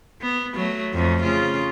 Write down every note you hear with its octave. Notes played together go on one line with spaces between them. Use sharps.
B3
F#3 A3
F2 A3
C#3 F4